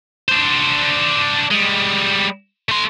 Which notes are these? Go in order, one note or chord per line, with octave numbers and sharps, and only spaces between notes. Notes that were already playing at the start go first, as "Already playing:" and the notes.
D4 C5
G3 G#3
A3 C6